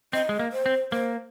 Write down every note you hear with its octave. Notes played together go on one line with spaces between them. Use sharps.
C4 D#5
G#3
A#3
C5
C4
A#3 C5